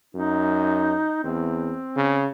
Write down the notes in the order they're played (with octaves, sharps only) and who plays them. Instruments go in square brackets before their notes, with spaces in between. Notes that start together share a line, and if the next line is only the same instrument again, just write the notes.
[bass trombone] F#2 [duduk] D#4
[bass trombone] E2 [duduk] C4
[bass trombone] C#3